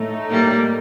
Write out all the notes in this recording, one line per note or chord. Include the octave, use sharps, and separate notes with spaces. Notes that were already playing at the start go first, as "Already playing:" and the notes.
Already playing: A2 A3 D#4
G3 A#3